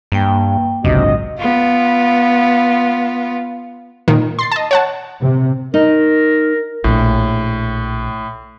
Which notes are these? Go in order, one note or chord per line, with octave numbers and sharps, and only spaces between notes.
G2 A#3 G5
G#1 C#2 F#2 C3 D4 F#4 D#5
B3 F4
A#2 D#3
C6 A6 C7
D#5 A5
C#5 F#5 A5
C3
D#4 A#4
A#1 A2